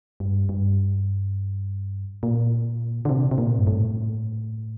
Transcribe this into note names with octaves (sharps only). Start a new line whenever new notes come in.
G2
G2
A#2
D3
C3
C3
A#2
G2
A2